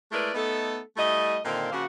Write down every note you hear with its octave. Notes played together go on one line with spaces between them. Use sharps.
G#3 A3 E4 A#4 B4 D5
A3 B3 D#4 A4
G3 A3 E4 D#5
A#2 D3 D#3 C4 F5
C#3 F3 A#3 F#4